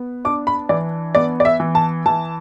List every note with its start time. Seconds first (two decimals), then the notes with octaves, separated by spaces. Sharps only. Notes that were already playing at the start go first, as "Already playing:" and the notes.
Already playing: B3
0.25 D4 D6
0.47 B5
0.69 E3 D5
1.15 B3 D5
1.40 D5
1.45 E5
1.60 E3
1.75 A5
2.06 E3 A5